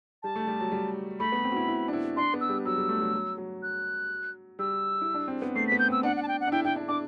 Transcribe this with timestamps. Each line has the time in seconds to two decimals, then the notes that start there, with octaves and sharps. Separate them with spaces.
0.23 G3 A5
0.36 A3
0.47 G3
0.60 F#3
0.72 G3
1.20 A3 B5
1.32 B3
1.44 C4
1.52 F#4
1.56 E4
1.68 E4
1.88 D4
1.93 E4
2.17 D4 C6
2.34 B3
2.41 E6
2.49 G3
2.65 F#3 E6
2.78 G3
2.89 A3
3.01 F#3
3.14 F#3
3.38 F#3
3.63 F#6
4.59 G3 E6
5.01 E4
5.14 D4
5.28 C4
5.42 B3
5.56 A3 C7
5.67 B6
5.72 B3
5.79 G6
5.88 C4 E6
6.03 D4 F#5
6.17 F#5
6.23 A5
6.28 G5
6.41 F#5
6.47 D4
6.52 E4 G5
6.64 E4 G5
6.76 D4
6.88 D4 D6